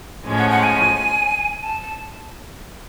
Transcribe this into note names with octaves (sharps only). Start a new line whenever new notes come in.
A2 F3 G#3 C#4
F#5
F#5
G#5
A5
A5